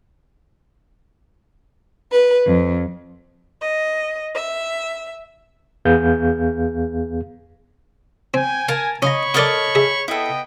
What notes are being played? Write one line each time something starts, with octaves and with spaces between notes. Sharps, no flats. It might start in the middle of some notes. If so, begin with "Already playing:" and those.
B4
F2
D#5
E5
E2 B3 G#4 F5 G6
C4 G5 G#5
A#4 F5 G#5 A5
C#4 C#5 D#5 F5 A#5 B5 C#6
A4 A#4 D5 D#5 F#5
G#4 E5
B3 E4 A4 D#5 G5